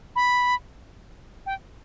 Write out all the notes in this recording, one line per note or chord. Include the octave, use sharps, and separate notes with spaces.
B5
G5